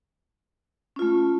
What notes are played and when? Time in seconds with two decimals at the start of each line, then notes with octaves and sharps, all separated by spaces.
0.96 C#4
0.99 F4
1.02 A3